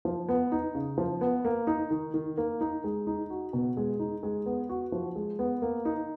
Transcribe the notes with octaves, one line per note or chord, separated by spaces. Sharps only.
F3
B3
D#4
C#3
F3
B3
A#3
D#4
D#3
D#3
A#3
D#4
G#3
D#4
F#4
B2
G#3
D#4
G#3
B3
F#4
F3
G#3
B3
A#3
D#4